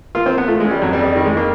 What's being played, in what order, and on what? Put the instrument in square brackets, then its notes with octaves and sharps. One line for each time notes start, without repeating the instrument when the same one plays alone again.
[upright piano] A#3 [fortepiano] F4
[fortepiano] C4
[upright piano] A#3
[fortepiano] B3
[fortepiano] A3 [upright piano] F4
[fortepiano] G#3
[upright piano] C#4
[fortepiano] G3
[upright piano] F2 [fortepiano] F#3
[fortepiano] G3
[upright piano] F2
[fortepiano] G3
[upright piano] D#3 [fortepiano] G3
[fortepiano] G#3
[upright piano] D#3 [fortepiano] A#3